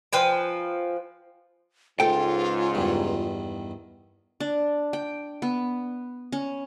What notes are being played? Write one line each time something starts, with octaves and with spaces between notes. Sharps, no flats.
F3 B4 G5 G#5
C#2 G#2 F4 A4 G5
E2 G2 D#3
D4
G5
B3
C#4